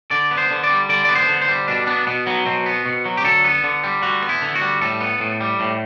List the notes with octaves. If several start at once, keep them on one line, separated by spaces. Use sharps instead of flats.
D3 D5
B3
C5
D3
D5
G3
D3 D5
B3 D5
C5
D3
C5
G3
B2 D4
B3 D4
B2 B3
F#3 B3
B2 C4
B3
B2
F#3
G4
D3 A4
B3
D3
G3
D3 F#4
B3
E4
D3
F#4
G3
A2 A4
B3
A2
G3
A2